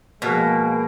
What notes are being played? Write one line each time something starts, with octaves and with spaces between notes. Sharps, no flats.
B2 F3 G#3 A#3 F#4 G#4